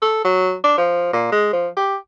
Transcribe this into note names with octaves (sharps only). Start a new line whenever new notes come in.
A4
F#3
D4
F3
A#2
G#3
F3
G4